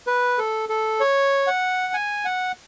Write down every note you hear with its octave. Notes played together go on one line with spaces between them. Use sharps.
B4
A4
A4
C#5
F#5
G#5
F#5